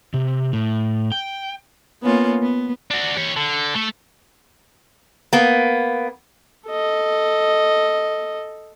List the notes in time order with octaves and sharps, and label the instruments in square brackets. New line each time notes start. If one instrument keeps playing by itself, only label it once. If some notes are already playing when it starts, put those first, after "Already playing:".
[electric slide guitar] C3
A2
G5
[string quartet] A#3 B3 C#4 F4
B3
[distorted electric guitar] D4 F#4
G4 C#5
D3
A3
[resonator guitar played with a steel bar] A#3 B3
[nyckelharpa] A4 D#5